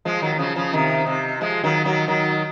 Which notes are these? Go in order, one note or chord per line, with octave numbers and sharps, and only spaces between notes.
F3 G#3
D#3 F#3
F#3
C#3 F3
C#3 F3
C3 D#3
C3
F3 G#3
D#3 F#3
D#3 F#3
D#3 F#3